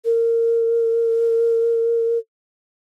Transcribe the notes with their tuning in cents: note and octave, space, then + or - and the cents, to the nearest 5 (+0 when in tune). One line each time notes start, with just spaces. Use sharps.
A#4 -20